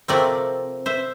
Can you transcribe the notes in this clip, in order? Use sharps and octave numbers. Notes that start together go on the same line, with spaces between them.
C3 F3 A3 C4 A#4 D5
C5 E5